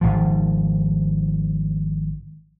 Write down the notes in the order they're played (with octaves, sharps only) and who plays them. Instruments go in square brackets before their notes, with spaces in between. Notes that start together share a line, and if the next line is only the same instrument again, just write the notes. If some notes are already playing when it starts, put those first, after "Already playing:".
[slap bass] G#1 C#2 F3